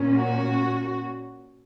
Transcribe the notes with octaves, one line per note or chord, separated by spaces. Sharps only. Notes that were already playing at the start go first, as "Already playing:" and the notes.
Already playing: A#2 A#3 C#4
F#4